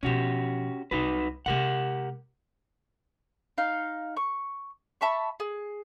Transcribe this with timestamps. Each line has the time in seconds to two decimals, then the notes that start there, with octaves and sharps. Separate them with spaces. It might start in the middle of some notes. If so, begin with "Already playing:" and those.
0.03 B2 F3 C#4 F#4 G4
0.91 C2 C3 D#4 F#4 B4
1.46 C3 G#3 G4 A#4 F#5
3.58 D#4 F5
4.17 C#6
5.01 E5 A5 B5 C#6
5.40 G#4